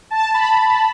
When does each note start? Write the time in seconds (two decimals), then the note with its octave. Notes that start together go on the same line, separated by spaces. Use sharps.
0.11 A5
0.34 B5
0.57 A5